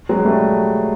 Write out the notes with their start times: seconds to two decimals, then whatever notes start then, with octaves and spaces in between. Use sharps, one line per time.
0.09 F#3 G#3
0.25 G3 A3